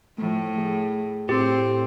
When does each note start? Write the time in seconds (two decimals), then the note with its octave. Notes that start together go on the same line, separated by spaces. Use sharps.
0.18 A2 F3 A3
0.58 G#4
1.29 A2 C4 G4